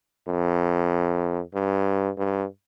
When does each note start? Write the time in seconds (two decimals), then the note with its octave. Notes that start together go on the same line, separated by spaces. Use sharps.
0.28 F2
1.54 G2
2.17 G2